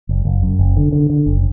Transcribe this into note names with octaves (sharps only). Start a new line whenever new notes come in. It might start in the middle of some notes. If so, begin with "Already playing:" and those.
F#1
F#1
F#2
F#1
D3
D3
D3
F#1